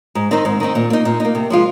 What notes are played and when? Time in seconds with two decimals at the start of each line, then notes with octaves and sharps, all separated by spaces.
0.15 G#2
0.31 D#3 C4 D#4
0.45 G#2
0.60 D#3 C4 D#4
0.75 A#2
0.90 A#3 D#4
1.05 A#2
1.20 A#3 D#4
1.35 C3
1.50 F3 G#3 F4